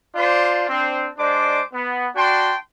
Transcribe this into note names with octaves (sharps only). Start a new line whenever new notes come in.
D4 F4 C5 D5
C4 D4
G#3 D4 C5 D5 D6
B3
D4 F#4 G5 A5 C6